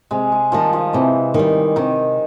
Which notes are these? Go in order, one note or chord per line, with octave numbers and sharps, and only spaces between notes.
C3 G#3
G#3
D#3 F3 G3
F3
C3 E3
D#3 G3
C3 D#3